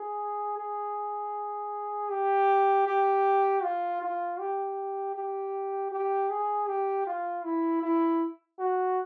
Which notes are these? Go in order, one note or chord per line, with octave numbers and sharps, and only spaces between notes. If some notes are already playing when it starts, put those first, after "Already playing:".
Already playing: G#4
G#4
G4
G4
F4
F4
G4
G4
G4
G#4
G4
F4
E4
E4
F#4